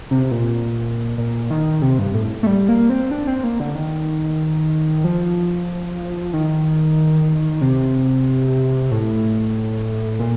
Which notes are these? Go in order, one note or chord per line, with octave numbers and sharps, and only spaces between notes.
C3
A#2
A#2
D#3
C3
G2
A2
A3
G3
A#3
C4
D4
C4
A#3
D3
D#3
F3
D#3
C3
A2
A#2